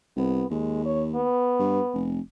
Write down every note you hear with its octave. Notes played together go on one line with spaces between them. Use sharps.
C2 B3
D#2 G#3
C#5
B3
G2
F1